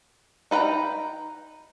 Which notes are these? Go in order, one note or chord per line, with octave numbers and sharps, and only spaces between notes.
D#4 B4 F5 G5 A#5